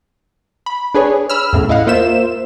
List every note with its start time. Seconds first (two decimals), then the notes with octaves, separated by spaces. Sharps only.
0.66 B5
0.95 D4 G#4 B4 C#5
1.30 B5 E6 F6
1.53 E2 A2 C#3
1.69 E4 D#5 F5 F#5
1.87 A#3 F4 C5 E5 E7